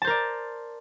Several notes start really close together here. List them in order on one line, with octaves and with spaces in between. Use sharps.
A5 C5 A#4 D5